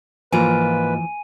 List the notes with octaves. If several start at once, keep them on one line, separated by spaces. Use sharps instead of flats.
G#2 E3 F3 A#3 F4 B4 G#5 D#7